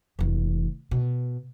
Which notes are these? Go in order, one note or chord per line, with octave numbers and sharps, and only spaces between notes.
F1 E3
B2